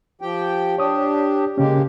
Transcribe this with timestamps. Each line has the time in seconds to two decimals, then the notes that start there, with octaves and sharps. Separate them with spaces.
0.21 F3 G4 G5
0.78 D4 G4 C#5 D#6
1.58 C#3 G#3 A#3 C#4 G4